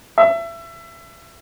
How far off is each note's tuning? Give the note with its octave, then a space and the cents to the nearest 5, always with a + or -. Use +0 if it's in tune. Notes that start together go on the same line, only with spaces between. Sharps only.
E5 +25